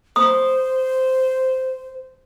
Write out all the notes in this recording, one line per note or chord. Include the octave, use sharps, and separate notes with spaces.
C5 D#6